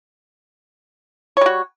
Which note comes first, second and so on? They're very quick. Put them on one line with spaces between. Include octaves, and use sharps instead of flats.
C#5 G3 F#4